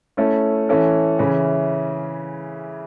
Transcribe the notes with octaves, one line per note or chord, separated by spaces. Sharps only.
A3 C#4 E4 A4
E3 C#4 A4
C#3 E3 C#4 E4